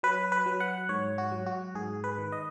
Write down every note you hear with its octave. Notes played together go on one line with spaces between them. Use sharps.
F#3 B4
B4
F#3
F#5
G#2 C#5
F#4
F#3
F#4
G#2 G#4
B4
D#3
D#5